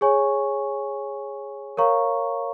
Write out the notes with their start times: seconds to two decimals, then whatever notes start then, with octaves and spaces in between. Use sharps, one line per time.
0.01 G#4 C#5 G#5 C#6
1.77 A#4 C#5 F5 A#5 C#6